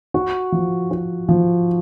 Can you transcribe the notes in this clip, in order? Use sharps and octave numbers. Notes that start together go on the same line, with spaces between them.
F#4
F3
F#4
F3